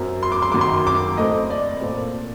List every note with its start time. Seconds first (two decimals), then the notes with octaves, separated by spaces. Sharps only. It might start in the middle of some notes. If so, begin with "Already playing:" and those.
Already playing: F#2 F#3 C4
0.23 C6
0.32 D6
0.42 C6
0.52 F#2 D#3 F#3 D6
0.61 C6
0.87 D6
1.17 A2 A3 C4 D#5
1.50 D5
1.82 A#2 A3 C4